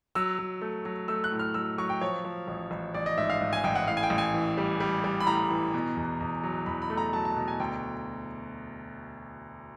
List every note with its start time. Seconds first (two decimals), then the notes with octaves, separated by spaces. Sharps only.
0.15 F#3 E6
0.38 F#3
0.62 A3
0.85 F#3
1.08 A3 E6
1.24 F#6
1.32 A2
1.39 F6
1.54 F#3 E6
1.78 F#3 C#6
1.89 G5
2.01 F3 C#5
2.25 F3
2.48 A1
2.71 A1
2.94 A1 D5
3.06 D#5
3.18 G#2 E5
3.30 F5
3.41 G#2
3.53 G#5
3.64 A1 G5
3.75 F#5
3.88 A2 F5
3.97 G#5
4.03 G5
4.10 A1
4.18 G#5
4.34 E3
4.58 G3
4.80 G3
5.04 G3
5.20 B5
5.27 A2 A#5
5.50 E3
5.74 B2
5.97 E2
6.20 E2
6.43 F#3
6.66 E2 B5
6.82 B5
6.90 A3
6.97 A#5
7.13 F#3 A5
7.25 A5
7.36 B2
7.48 G#5
7.60 D2 G5